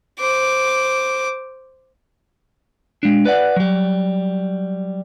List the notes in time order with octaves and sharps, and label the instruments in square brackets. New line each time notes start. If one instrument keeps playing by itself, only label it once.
[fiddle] C5 D6
[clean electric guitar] G#3 D4
B4 D5 F#5
F#3 G3